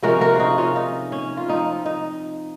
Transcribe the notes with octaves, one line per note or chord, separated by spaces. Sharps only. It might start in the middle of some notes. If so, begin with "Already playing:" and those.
C3 F3 G#3 C#4 F#4 A#4
F#4 A#4
D#4 F4 F#4
C#4 F4
D#4
C#4
F4
F3 C4 D#4
D#4